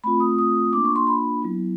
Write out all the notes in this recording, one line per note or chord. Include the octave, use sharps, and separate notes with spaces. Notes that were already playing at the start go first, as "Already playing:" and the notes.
A3 C4 F4 B5
D#6
D#6
A#3 D4 F4 D6
C#6
C6
B5
F#3 B3 E4